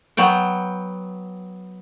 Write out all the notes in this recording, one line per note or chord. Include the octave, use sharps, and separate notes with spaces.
F#3 B3 G5